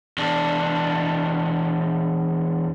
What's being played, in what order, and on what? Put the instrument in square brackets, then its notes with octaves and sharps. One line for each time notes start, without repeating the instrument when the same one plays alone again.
[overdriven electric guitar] E2 D4